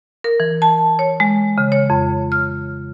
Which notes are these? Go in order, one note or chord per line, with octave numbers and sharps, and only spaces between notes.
A#4
E3
A5
C#5
G#3
C#3
C#5
F2
F6